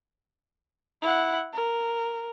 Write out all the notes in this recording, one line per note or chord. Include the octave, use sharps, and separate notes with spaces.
E4 F#5
A#4